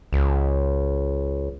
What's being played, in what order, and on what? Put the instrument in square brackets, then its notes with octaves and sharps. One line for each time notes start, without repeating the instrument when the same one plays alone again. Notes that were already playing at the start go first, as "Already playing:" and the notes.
[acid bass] C#2